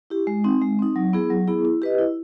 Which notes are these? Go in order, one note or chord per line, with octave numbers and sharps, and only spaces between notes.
E4 G4
G#3
C4 D#4
G#3
C4 D#4
F#3
B3 E4 G#4
F#3
B3 E4 G#4
E4
G4 B4 D#5
E4